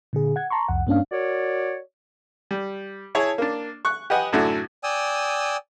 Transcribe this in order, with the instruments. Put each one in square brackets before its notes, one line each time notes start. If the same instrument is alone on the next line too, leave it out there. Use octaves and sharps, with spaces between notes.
[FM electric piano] A#2 D3 G#4
F#5 G#6
A5 A#5 C6 C#6
C2 F2 F#5
G2 A#3 C#4 D4 F5
[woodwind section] F#4 A#4 C#5 D5
[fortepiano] G3
E4 G#4 C#5 A5
A#3 D4
C#6 F#6
G4 B4 D#5 F#5 G#5
F#2 A2 D3 D4 E4 F#4
[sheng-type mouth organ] D5 G5 G#5 D#6 E6